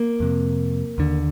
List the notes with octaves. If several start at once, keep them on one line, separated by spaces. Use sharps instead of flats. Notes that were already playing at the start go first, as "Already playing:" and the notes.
Already playing: A#3
F2 C3
D#2 D3